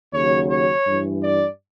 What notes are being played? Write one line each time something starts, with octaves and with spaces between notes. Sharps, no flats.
D#2 C#3 F#3 C#5
C#5
G2 E3
D5